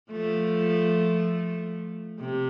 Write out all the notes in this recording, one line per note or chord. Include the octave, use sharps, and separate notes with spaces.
F3 A3
C3